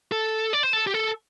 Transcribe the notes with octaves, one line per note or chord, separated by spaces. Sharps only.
A4
D5
C5
A4
G4
A4